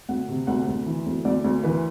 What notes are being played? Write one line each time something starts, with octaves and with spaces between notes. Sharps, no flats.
D2 F#5
C3
D2 F#5
D2
E3
D2
D2 D5
D2
E3 B4